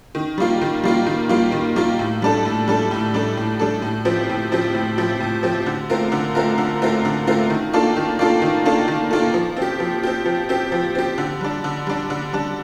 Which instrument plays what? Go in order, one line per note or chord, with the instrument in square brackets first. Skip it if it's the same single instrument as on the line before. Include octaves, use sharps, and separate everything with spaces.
[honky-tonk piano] D#3
G3 A#3 F4
D#3
G3 A#3 F4
D#3
G3 A#3 F4
D#3
G3 A#3 F4
A2
G3 D4 A4
A2
G3 D4 A4
A2
G3 D4 A4
A2
G3 D4 A4
A2
F3 C4 G4
A2
F3 C4 G4
A2
F3 C4 G4
A2
F3 C4 G4
D3
A3 C4 F4 A#4
D3
A3 C4 F4 A#4
D3
A3 C4 F4 A#4
D3
A3 C4 F4 A#4
D#3
A#3 D4 F4 A4
D#3
A#3 D4 F4 A4
D#3
A#3 D4 F4 A4
D#3
A#3 D4 F4 A4
F3
C4
G4
F3
C4 G4
F3
C4 G4
F3
C4 G4
D3
G3 D4
D3
G3 D4
D3
G3 D4